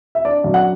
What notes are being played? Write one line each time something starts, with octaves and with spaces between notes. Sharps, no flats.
E5
D4 D5
F#2
F#5